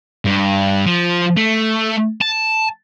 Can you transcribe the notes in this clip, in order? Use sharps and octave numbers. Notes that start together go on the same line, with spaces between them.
G2
F3
A3
A5